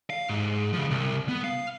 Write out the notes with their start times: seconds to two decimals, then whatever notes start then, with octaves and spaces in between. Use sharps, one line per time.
0.10 F5
0.29 G#2
0.73 C#3 F3
0.90 C2
1.28 B3
1.44 F5